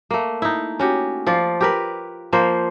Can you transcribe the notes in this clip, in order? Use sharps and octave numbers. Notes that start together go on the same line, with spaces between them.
A3 A#3
D#4 E4
C#4 F#4 G4
F3 F4 D5
G4 A#4 B4
F3 A#3 A#4 C5